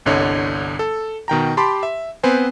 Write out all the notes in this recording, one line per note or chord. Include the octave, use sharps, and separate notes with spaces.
G1 C2 D3 C#5 D#5
A4
B2 D#3 G5 A#5
G4 A5 B5 C6 D6
E5
B3 C4 B4 C5 G#5